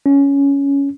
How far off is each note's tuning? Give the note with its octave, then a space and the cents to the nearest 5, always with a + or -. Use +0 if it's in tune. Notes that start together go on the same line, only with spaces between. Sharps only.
C#4 +10